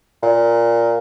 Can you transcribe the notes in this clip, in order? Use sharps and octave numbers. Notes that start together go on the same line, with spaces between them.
A#2